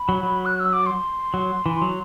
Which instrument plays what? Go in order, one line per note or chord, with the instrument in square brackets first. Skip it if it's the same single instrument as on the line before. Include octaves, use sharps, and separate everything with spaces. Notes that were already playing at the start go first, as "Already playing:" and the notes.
Already playing: [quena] B5
[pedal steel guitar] F#3
F#3
[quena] F#6
E6
D6
C6
[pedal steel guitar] F#3
E3
F#3